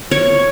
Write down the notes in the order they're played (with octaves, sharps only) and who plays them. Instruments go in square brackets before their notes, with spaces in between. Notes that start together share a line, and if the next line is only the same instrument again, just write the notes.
[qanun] C#5